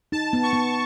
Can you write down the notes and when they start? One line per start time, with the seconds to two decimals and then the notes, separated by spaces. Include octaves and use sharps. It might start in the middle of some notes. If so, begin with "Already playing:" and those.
0.12 D#4 A5
0.33 B3
0.43 C#6
0.53 B3